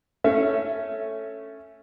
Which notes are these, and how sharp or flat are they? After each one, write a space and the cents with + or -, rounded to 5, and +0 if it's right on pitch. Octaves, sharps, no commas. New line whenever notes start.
A3 +0 C#4 +0 E5 +30